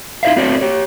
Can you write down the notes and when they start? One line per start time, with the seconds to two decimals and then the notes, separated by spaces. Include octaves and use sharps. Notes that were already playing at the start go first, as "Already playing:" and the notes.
0.23 D#4 E4 C5 C#5 E5 F5
0.36 A3 C4 F#4 C#5 D5
0.61 G4 C#5